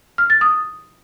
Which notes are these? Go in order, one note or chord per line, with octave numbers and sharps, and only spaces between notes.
F6
A6
D#6